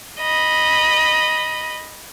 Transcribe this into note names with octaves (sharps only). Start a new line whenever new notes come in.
D#5 B5